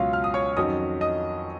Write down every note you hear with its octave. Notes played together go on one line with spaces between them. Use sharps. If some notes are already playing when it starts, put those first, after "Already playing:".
Already playing: C#2 B2 F#3 C#4 F4 F5
F6
D#6
C#5 C#6
F2 D#3 F#3 C#4 D#5 D#6
D#5 D#6